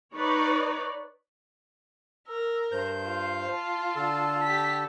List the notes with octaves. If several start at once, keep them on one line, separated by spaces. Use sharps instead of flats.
D#4 B4 C#5 D5
A#4 E6
G2 C5 G6
F4
A5
D3 A4
G4 B6